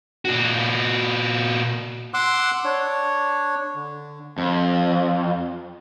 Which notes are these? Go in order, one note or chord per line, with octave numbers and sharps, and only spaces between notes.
A#2 F#4
F#5 C6 D6 E6 F#6
D4 C#5
D3
F2